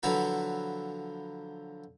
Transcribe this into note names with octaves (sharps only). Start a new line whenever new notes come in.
D3 F3 F#3 E4 F#4 B4